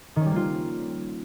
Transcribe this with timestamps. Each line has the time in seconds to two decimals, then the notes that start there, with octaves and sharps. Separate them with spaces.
0.16 D#3
0.21 C#4
0.26 G3
0.31 A#3
0.36 F4